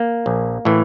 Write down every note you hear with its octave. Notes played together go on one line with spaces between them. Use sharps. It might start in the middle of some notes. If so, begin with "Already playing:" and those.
Already playing: A#3
A#1
A2 E3